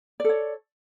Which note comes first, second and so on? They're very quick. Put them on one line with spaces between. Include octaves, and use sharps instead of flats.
D5 A4 C#5